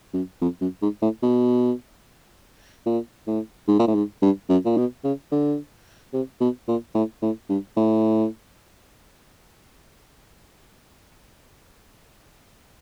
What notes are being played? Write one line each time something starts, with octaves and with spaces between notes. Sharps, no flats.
F#2
F2
F#2
G#2
A2
B2
A#2
A2
G#2
A#2
A2
G#2
G2
F#2
A#2
B2
C#3
D3
C3
B2
A#2
A2
A2
G2
A2